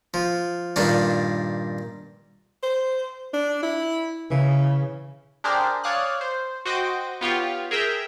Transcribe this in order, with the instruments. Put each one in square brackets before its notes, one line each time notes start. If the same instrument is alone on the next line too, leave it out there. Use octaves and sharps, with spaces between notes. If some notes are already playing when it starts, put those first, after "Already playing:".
[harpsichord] F3
G2 A#2 D#3 D4
[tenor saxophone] C5
D4
E4
[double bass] C#3 [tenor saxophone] E3
[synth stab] D4 G4 G#4 A#4 C5 D5
C#5 D5 F5 D#6 F#6
C5
F#4 C5 D#5 G5 D6
B3 F4 G4 C#5
G#4 A#4 E5 G5